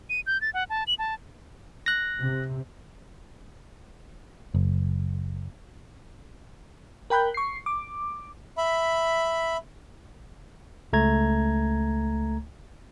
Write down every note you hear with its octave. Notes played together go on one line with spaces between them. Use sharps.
D#7
G6
A6
F#5
A5
F#7
A5
F#6 A#6
C3
F#1
A#4 G5 B5 F#6 G6
C#6 C7
D6
E5 B5
C#2 A3 A#5 G#6